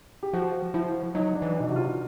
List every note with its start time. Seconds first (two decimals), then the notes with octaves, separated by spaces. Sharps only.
0.23 G4
0.33 F3 F#4
0.74 F3 E4
1.15 F#3 D#4
1.35 D4
1.42 E3
1.56 B2 D#4
1.69 C3 F#4
1.76 F4